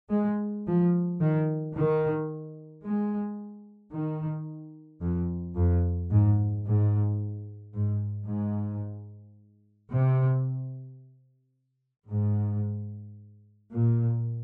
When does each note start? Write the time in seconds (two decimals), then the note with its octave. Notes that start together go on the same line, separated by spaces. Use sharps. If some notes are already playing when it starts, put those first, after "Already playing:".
0.11 G#3
0.66 F3
1.20 D#3
1.75 D#3
2.84 G#3
3.92 D#3
5.02 F2
5.55 F2
6.10 G#2
6.65 G#2
7.74 G#2
8.28 G#2
9.92 C3
12.10 G#2
13.72 A#2